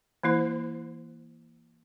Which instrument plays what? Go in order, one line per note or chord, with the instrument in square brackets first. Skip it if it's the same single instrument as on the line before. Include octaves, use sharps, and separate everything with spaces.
[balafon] E3 A#3 E4 C5